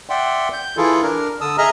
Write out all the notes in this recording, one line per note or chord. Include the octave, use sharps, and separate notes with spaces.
D5 E5 F#5 G5 C6
G6
E3 E4 F4 G#4 A4
D4 A#4
D3 A5 D#6 E6
G#4 D#5 E5 A#5 F6